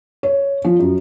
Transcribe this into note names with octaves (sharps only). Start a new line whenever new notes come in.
C#5
F3
F#2